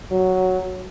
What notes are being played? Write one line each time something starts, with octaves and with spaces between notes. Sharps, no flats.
F#3